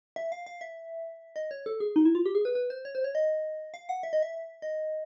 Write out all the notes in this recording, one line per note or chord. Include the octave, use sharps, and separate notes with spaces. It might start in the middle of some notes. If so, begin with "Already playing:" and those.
E5
F5
F5
E5
D#5
C#5
A4
G#4
D#4
E4
F4
G4
G#4
B4
B4
C5
C#5
C5
C#5
D#5
F5
F#5
E5
D#5
E5
D#5